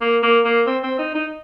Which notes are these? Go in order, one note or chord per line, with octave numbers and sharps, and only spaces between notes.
A#3
A#3
A#3
C4
C4
D#4
D#4